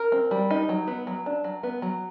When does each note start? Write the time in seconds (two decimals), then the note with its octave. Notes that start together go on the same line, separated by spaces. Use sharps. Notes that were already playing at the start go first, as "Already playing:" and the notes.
Already playing: A#4
0.12 C4
0.31 G3
0.51 D#4
0.69 F#3
0.87 B3
1.07 F#3
1.26 D4
1.44 F#3
1.63 B3
1.82 F#3